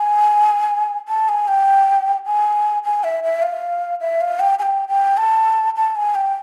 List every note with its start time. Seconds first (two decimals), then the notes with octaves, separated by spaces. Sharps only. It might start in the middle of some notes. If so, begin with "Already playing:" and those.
Already playing: G#5
1.08 A5
1.29 G#5
1.48 G5
2.26 G#5
2.85 G#5
3.04 E5
3.24 E5
3.42 F5
4.01 E5
4.21 F5
4.40 G5
4.59 G#5
4.62 G5
4.88 G5
5.17 A5
5.76 A5
5.96 G#5
6.15 G5